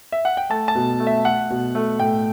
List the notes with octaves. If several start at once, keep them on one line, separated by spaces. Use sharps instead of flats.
E5
F#5
G5
A3 A5
A5
B2
A3
E5
A3 F#5
B2
A3
A2 G5